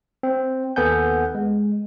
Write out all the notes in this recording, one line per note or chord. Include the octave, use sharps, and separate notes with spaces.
C4
D#2 B3 A4 F#5 G#5 G6
G#3